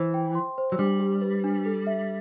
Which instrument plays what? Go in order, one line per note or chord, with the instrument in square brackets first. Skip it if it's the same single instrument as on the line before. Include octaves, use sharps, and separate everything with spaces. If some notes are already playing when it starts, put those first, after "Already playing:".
Already playing: [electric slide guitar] E3 [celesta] C5
[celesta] G5
C6
C5
[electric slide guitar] F#3
[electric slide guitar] G3 [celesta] D4
[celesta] G4
B4
D4
A4
E5